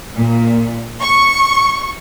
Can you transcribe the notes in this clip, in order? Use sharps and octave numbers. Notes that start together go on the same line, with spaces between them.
A#2
C#6